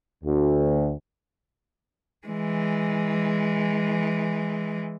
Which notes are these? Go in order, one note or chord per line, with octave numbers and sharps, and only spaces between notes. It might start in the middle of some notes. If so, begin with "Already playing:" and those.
D2
E3 G#3